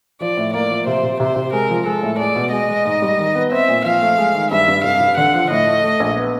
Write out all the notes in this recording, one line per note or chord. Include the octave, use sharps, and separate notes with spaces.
F3 D5
A2
A#3 D5
F3
C3 C5
C3
C3 C5
C3
G#3 A#4
F3
G#3 A4
A2
G#3 D5
B2
G#3 D#5
G#3
G#2
G3
D#3
B3
C4 E5
A#2
F3 F5
A3
G#3
D#3
G2 E5
G2
F1 F5
F1
D3 F#5
F3
A2 D#5
A3
A3
A#1
B3